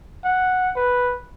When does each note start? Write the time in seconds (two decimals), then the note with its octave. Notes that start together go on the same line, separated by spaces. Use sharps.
0.24 F#5
0.76 B4